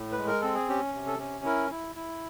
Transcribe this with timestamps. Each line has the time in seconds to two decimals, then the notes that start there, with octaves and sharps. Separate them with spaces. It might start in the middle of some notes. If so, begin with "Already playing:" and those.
Already playing: A2
0.12 B4
0.18 G#3
0.27 A#4
0.41 C4 A4
0.54 G#4
0.69 C#4 G4
0.94 C3
1.07 A4
1.19 C#4
1.45 E4 A#4
1.71 E4
1.96 E4